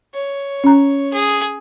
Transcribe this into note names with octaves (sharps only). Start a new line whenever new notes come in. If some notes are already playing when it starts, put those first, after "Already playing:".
C#5
C#4 A#5
G#4